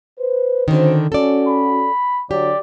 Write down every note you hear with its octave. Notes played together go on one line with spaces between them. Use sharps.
B4 C5
D3 D#3 C#4 F#4 C5
C#4 F#4 A4 D5
B5
D3 F#3 G4 D5